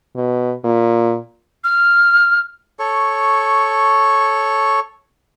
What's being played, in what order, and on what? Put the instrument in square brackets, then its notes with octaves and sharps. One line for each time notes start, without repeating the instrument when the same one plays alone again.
[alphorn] B2
A#2
[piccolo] F6
[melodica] A4 C#5 C#6